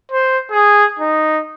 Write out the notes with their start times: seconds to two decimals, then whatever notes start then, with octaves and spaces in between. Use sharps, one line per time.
0.12 C5
0.51 G#4
0.99 D#4